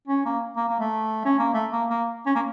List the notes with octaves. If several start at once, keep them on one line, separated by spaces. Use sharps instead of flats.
C#4
A#3
A#3
A#3
A3
C#4
A#3
A3
A#3
A#3
C#4
A#3